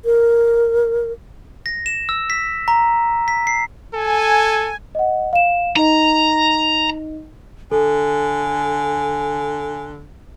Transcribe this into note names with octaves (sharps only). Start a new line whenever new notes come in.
A#4
A#6
E7
E6
B6
A#5
B6
C7
A4 G#5
D#5 F#5
F5 E7
D#4 D#5 A#5
D3 A4 G#5